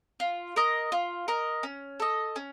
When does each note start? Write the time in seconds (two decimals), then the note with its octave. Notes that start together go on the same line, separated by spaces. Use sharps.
0.20 F4
0.56 A#4 D#5
0.92 F4
1.28 A#4 D#5
1.63 C#4
2.00 A4 D#5
2.36 C#4